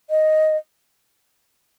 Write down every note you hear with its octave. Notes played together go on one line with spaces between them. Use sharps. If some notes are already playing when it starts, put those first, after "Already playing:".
D#5